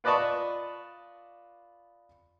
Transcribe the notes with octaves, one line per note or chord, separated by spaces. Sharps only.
F4 B4 D5 D#5 A5 C#6